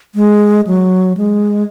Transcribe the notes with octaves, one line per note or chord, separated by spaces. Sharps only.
G#3
F#3
G#3